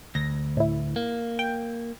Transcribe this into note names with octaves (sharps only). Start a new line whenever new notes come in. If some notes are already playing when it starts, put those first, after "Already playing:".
D2 A#6
A2 E4
A#3
G5